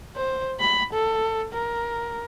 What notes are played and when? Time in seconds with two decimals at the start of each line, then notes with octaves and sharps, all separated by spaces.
0.16 C5
0.59 B5
0.93 A4
1.53 A#4